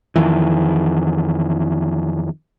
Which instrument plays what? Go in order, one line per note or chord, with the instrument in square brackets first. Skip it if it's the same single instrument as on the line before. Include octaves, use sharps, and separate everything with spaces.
[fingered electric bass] F2 D#3 E3